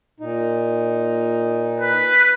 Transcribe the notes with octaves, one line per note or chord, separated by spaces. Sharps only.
A#2 D#4
B4